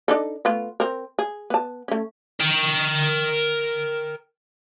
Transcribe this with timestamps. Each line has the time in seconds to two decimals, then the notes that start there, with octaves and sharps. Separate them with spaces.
0.08 D4 D#4 A4
0.45 A3 B3 F4
0.80 C4 A#4
1.19 G#4
1.50 B3 A5
1.88 A3 C#4
2.40 A#4 G5